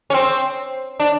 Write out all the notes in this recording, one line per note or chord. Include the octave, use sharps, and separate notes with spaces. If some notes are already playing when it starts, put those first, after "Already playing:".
C#4
C4
D4